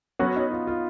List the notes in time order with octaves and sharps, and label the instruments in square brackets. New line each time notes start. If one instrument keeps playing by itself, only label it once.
[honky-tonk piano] F#3 C#4 F#4 [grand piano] B3
[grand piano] D#4
F4
F4